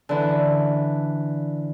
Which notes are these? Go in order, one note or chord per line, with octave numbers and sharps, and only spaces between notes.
D3 E3